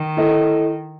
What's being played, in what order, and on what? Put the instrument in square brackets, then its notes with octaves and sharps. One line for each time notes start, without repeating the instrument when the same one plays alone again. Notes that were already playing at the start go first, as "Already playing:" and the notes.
Already playing: [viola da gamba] D#3
[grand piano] E4 A4 D#5